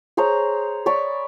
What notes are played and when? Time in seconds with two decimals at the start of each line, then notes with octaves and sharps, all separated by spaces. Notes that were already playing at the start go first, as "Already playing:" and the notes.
0.17 G#4 C5 C#5 A#5
0.86 C#5 D5 B5 C#6